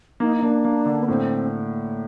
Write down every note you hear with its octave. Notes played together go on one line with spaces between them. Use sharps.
A#3 D#4
D#4
A#3 D4
A#3
D3
B3
A2 C4